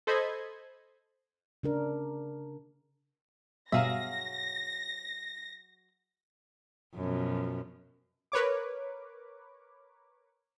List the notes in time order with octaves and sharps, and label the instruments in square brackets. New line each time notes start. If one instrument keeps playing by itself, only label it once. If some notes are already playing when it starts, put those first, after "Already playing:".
[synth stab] A4 C5 D#5 B5 G#6
[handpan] C#3 D4 A#4
[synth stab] G2 B2 F5 [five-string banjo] F#3 G#4 E5 [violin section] A#6
[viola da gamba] F#2 B2 F3
[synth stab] A#4 B4 C#5 D6